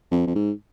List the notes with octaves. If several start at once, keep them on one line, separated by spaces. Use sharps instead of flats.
F2
F2
G#2